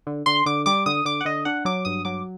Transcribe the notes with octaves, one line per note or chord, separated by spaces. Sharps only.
D3
D3 C6
D3 D6
G3 D6
D3 D#6
D3 D6
F#5
D3 D#5
D4 F#5
F#3 D6
G2 D#6
F#3 D6